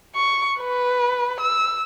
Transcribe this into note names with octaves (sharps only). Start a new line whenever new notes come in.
C#6
B4
E6